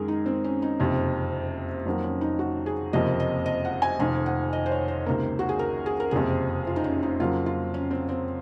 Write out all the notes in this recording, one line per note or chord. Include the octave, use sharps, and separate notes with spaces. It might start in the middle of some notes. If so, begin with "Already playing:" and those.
Already playing: F#2 D#3 G#3 G#4 A#4
D#4
C4
C#4
D#4
F#1 F2 C3
F2 D#3 F#3 A#3
C#4
D#4
F#4
G#4
F#1 F2 C3 F3 A#3 D#5
D#5
D#5
F#5
G#5
F1 F2 D#3 G#5
F#5
D#5
C5
C#5
C5
C#2 C3 D#3 A#3
F#4
G#4
A#4
G#4
A#4
F#1 F2 C3 G#4
F4
D#4
C#4
D#4
F2 C#3 F#3 A#3 F4
F4
C#4
C4
C4